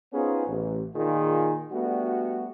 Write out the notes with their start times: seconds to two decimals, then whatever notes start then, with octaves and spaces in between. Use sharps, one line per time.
0.12 B3 C#4 D#4 F4 G#4 C5
0.46 A1
0.95 A#2 D#3 F4 G#4
1.72 G3 A3 B3 D4 F#4